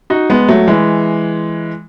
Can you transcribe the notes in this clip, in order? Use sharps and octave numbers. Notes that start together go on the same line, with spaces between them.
D#4 F#4
G#3 B3
F#3 A3
E3 G#3